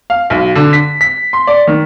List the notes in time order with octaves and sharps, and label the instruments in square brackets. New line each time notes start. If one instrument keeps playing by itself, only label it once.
[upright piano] F5
B1
D3
B6
B6
C6
D5
D#3